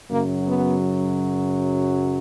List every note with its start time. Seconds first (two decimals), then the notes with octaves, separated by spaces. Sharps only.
0.10 F#2 C#3 F#3 A#3
0.44 B3